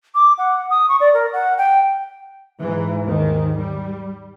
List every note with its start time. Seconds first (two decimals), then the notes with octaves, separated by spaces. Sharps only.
0.15 D6
0.38 F#5
0.70 D#6
0.89 C#6
1.00 D5
1.14 A#4
1.33 F#5
1.58 G5
2.59 G#2 E3
3.04 D#2 G#2 D#3
3.57 G3